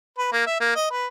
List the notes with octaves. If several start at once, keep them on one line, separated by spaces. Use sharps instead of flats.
B4
A#3
E5
A#3
D#5
B4